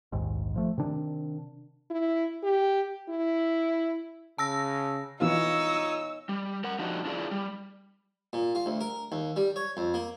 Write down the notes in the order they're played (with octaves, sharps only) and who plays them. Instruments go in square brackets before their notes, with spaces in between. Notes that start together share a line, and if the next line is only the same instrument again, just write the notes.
[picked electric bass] A#1 D#2 G#2
F3 A3
C3 D#3 D4
[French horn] E4
G4
E4
[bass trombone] C#3 [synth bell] A5 E6 A#6
[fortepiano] B2 E3 [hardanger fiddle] D#4 C#5 [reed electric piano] F4 F5 [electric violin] E6
[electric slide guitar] G3
A#4 F#5
F3 G3 D4 D#4 F#4
D4 E4 F4 G#4 C#5 D5
G3
[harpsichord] A#2
F4
D2
A#4
D#2
G3
C#5
F2
A#3